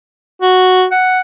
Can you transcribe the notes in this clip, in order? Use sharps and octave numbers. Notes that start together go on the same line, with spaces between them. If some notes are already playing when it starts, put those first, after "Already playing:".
F#4
F#5